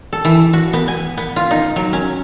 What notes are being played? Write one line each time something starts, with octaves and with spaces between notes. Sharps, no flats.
A4
E3
F#4
B3
G#5
B3
F4
D#4
F#3
C#4